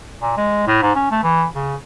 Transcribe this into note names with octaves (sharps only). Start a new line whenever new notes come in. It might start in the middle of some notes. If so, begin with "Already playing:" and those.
A#2
G#3
A2
G#2
C#4
A3
E3
C#3